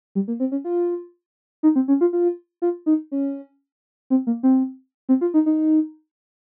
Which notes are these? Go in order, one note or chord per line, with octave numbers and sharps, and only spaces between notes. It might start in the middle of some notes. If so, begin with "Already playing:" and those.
G3
A#3
C4
C#4
F4
D#4
C4
C#4
F4
F4
F4
D#4
C#4
C4
A#3
C4
C4
F4
D#4
D#4